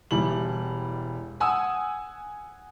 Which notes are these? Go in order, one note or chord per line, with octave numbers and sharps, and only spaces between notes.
E1 E3 G3 F#7
F#5 G#5 D#6 E6